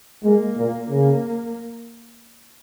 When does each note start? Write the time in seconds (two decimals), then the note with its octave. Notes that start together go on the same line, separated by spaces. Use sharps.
0.24 G#3 A#3
0.57 A#2
0.90 C#3 A#3